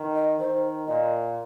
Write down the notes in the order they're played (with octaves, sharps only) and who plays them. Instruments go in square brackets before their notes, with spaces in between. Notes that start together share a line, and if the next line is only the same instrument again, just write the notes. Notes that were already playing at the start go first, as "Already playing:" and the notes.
Already playing: [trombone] D#3
[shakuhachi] D#5
[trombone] D#3 [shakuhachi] C5
[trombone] A#2 [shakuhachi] D#5